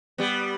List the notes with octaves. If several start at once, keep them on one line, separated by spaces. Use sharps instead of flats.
G3 B3